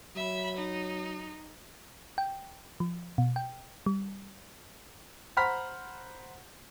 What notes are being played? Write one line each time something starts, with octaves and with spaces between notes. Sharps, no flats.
F#3 E5 B5
D#4
G5
F3
B2
G5
G3
C5 F#5 A#5 B5 F6 B6